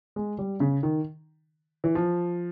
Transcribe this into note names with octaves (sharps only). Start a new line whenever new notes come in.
G#3
G3
C#3
D#3
E3
F3